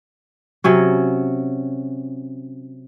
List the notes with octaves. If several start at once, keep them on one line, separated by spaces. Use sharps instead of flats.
C3 F#3 C#4